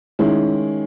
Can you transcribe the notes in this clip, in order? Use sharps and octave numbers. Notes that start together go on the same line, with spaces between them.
D#3 G#3 C#4 E4